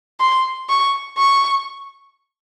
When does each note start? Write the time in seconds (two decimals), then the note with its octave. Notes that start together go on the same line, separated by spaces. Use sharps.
0.20 C6
0.69 C#6
1.18 C#6